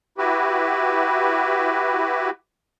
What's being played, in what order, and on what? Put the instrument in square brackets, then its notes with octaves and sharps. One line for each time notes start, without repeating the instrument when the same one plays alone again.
[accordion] E4 F#4 G4 B4